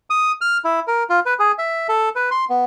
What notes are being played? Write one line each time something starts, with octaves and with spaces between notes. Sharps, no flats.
D#6
F6
E4
A#4
F4
B4
G#4
E5
A4
B4
C6
B3